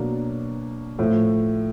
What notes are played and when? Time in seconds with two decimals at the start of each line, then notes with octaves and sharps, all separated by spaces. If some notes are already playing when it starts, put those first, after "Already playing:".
Already playing: B2 F#3 A#3 D4
0.99 A2 F3 A3